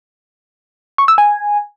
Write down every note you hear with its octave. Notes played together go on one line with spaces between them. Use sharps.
C#6
E6
G#5